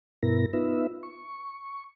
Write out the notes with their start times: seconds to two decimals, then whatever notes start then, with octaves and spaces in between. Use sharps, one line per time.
0.23 G2 B2 B3 E4 A#4 A#6
0.53 B3 D#4 F4 B4 E5
1.03 C#6